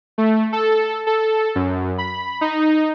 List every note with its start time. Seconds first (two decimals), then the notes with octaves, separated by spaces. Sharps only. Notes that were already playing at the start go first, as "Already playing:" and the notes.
0.18 A3
0.53 A4
1.07 A4
1.55 F#2
1.98 B5
2.41 D#4